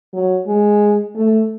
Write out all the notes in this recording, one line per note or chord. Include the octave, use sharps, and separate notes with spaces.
F#3
G#3
A3